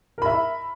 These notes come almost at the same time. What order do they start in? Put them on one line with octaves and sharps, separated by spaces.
A#4 B5 E5